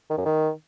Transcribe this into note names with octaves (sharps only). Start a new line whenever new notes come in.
D#3
F#2
D#3